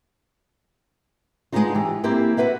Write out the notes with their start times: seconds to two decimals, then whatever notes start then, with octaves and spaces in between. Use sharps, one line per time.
1.52 G#3 A#3 B3 D4 D#4 F4
1.75 E3 G4
2.04 A#3 C4 E4 G4 C5
2.37 F#4 G4 B4 E5 F#5